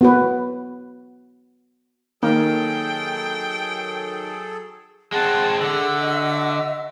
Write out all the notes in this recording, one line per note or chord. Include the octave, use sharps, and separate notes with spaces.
B3 F#4 B4
D#3 F#3 A#3 G#4 A4 G5
G#3 C4 G#4 F#5 A5
D3 F#4 E5 E6
D#5